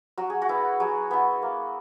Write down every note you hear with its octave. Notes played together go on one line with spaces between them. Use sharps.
F#3 F#4
G#4
F#4
B3 E4
F#3 G#4
B3 E4
A#3